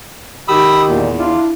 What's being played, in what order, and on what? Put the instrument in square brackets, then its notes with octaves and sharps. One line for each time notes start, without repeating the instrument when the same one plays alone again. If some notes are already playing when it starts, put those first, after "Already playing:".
[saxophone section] D#3 G4 [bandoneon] B5 D#6 E6
[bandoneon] E2 [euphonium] A#2
[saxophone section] D4 F4 [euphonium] E4